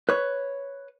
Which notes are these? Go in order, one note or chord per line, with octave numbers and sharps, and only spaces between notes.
B4 C#5